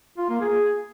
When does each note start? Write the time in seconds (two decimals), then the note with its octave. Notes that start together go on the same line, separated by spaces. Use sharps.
0.18 F4
0.29 A#3
0.41 G#4